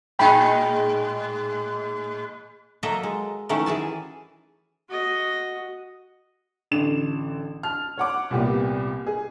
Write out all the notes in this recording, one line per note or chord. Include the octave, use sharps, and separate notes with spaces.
A2 G#3 D#4 G5 B5
F#3 A#3 A4 D#5 E5
G#3
D#3 E3 F#3 A3 C#4
E3 G#4 G#5 A5
F#4 D#5
A1 D3 E7
A5 F6
C#5 F#5 D6
C2 A#2 A#3 B3 G4
G#4